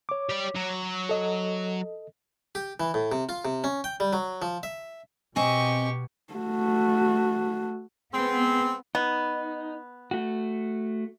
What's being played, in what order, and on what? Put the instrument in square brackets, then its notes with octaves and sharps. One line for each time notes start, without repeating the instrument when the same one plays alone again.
[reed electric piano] C#5 D6
[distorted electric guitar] G4 D5
F#3
[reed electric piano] A4 D#5
[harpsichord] G4
E3
A2
C3
F4
C3
C#4
G5
G3
F#3
F3
E5
[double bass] B2 [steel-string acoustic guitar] C4 D#5 G#5 [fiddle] G4 C#6
[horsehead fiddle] A3 F#4
[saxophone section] G#3 C4 [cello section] B3
[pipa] B3 [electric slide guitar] D#4
[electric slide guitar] A3 F#4